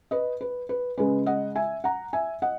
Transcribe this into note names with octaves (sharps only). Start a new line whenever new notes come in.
B4 D#5
B4
B4
C#3 G#3 C#4 B4
D#5 F#5
E5 G#5
F#5 A#5
E5 G#5
D#5 F#5